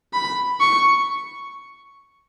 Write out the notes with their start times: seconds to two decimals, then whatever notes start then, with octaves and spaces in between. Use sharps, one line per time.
0.13 B5
0.60 C#6